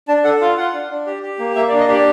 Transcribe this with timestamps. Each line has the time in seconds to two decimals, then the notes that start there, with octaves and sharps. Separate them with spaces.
0.08 D4 A5
0.24 A4 F#5
0.41 F4 F5
0.57 F4 F#5
0.73 D4
0.90 D4
1.06 G4
1.23 G4
1.39 A#3
1.56 A#3 E5
1.68 D5
1.73 D4
1.80 D#5
1.88 G4 D5